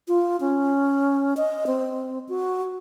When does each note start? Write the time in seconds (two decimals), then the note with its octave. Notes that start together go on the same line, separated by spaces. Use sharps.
0.08 F4
0.40 C#4
1.37 D#5
1.67 C4
2.29 F#4